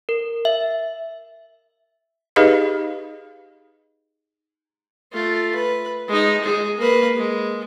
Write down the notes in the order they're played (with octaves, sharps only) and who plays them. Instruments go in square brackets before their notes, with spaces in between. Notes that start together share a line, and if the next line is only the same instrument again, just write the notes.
[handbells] A#4
E5
[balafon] D#4 G4 G#4 B4 D#5 F5
[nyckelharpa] A3 F4
B4
G#3 D#4
G#3 G#4
A#3 B4
G#3